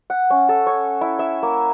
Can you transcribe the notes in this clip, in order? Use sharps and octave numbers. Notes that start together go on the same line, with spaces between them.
F#5
C#4
A4
C#5
E4
E5
A#3